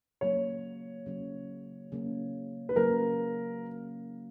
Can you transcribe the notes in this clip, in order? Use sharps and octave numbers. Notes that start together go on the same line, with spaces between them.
C#3 F#3 A#3 C#5
C#3 F#3 A#3
C#3 F#3 A#3
B4
C#3 F#3 A#3 A#4